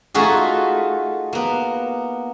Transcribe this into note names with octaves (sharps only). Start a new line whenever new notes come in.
A3 D#4 F4 F#4 G#4
A#3 B3